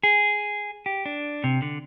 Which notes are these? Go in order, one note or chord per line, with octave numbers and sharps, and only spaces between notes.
G#4
G4
D4
C3
D3